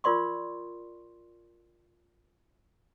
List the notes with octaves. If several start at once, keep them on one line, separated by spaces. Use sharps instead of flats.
F4 A#4 D5 C6 C#6